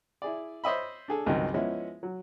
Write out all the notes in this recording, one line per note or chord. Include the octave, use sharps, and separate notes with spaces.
E4 G#4 D5
C5 C#5 D#5 E5 B5
D4 G#4 A4
C#2 G2 D#3 F#3 G#3 C4
F3 G#3 B3 C#4 E4
F#3